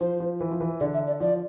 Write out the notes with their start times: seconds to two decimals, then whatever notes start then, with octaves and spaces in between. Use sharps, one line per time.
0.01 F3 C5
0.20 F3
0.41 E3
0.51 F3
0.60 E3
0.80 D3 D5
0.94 E5
1.07 D5
1.20 F3 D5